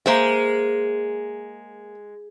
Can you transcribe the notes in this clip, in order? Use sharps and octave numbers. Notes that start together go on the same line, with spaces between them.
G#3 A#3 C5 E5